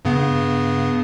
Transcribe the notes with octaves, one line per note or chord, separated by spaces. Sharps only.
G2 C#3 B3